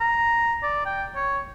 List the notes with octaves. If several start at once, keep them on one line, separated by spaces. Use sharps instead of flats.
A#5
D5
G5
C#5